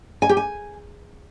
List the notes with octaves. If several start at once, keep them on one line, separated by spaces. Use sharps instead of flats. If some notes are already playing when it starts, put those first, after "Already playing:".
G#5
G4
G#5